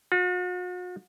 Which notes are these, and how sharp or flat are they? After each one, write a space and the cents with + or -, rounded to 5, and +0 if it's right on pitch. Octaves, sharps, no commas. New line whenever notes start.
F#4 -45